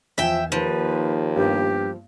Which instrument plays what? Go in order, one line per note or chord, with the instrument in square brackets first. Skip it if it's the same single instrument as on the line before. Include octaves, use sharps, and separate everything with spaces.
[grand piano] E2 G#5 [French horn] F3 [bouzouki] E5 G5
[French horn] D#2 [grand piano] D#3 A#3 [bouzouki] F3 [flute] B4
[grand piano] G2 A#3 B3 [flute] G4